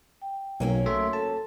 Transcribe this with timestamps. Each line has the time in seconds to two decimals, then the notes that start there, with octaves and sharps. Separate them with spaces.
0.22 G5
0.60 B1 F#3 A#3 C#4
0.86 A3 E5 C6
1.13 A4 A5